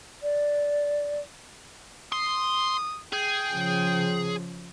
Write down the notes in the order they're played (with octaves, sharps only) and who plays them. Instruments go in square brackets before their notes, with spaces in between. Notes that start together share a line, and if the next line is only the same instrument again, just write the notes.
[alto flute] D5
[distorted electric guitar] C6 [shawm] D#6
[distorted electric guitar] G#4 [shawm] G5
[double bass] C#3 F3